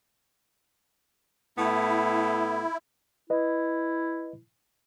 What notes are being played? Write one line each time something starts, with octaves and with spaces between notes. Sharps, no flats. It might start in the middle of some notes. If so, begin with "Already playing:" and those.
A2 B3 E4 A4
E4 B4 D#5